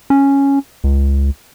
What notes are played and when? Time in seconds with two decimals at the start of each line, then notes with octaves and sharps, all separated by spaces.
0.10 C#4
0.84 C#2